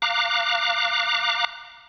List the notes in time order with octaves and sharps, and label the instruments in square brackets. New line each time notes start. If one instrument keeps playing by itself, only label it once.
[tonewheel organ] F5 A#5 D6 F#6